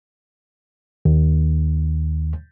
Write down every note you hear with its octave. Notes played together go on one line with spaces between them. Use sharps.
D#2